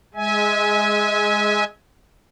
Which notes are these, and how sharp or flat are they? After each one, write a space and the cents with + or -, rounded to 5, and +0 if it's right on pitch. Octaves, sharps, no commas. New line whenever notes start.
G#3 -5 E5 -30 G#5 +5